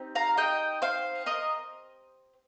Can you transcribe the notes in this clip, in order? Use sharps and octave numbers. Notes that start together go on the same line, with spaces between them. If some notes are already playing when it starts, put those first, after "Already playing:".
Already playing: C4 D#4 G4
F5 A#5
D#5 G5
C5 F5
A#4 D#5